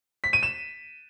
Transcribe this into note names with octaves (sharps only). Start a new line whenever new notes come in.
B6
D#7
E7